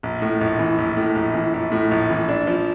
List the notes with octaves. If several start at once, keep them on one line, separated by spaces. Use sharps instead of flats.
A#1
A2
A#1
E3
A#1
A2
A#1
E3
A#1
A2
A#1
E3
D4
F3